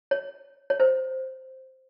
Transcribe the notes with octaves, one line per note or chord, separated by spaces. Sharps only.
C#5
C#5
C5